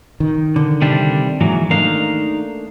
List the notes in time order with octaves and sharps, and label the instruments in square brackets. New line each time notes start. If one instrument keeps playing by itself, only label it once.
[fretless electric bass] D#3
[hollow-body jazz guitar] D3
[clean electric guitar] C3 G3 D4
[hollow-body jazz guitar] G#2 [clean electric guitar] E3 F#3 A#3
[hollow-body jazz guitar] A3 A#3 D4 [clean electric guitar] D#4 F5